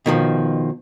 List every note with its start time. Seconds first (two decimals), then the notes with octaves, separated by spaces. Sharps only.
0.06 B2 D#3 F3